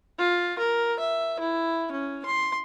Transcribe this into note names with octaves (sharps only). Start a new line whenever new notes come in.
F4
A#4
E5
E4
C#4
C6